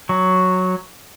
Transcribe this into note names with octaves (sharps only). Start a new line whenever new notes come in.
F#3